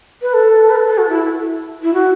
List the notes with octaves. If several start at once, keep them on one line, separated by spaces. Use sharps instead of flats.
B4
A4
B4
A4
A4
F#4
E4
E4
F#4